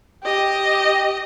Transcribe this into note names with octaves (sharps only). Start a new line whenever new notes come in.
G4 D#5